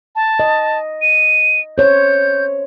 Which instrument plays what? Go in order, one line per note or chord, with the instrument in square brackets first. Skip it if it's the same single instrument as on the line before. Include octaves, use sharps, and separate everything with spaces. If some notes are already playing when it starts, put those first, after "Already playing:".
[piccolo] A5
[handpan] D#5
[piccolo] D#7
[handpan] C5 C#5 [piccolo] G6